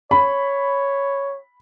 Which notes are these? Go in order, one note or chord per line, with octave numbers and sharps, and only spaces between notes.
C#5 B5